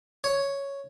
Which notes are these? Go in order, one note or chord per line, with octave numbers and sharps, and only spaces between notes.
C#5